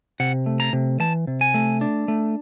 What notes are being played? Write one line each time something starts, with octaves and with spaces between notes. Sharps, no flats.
C3 F#5
A3
A#5
C3
E3 A5
C3
G#5
A3
D4
A3